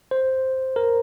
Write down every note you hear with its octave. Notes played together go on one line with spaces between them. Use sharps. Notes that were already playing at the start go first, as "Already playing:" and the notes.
C5
A#4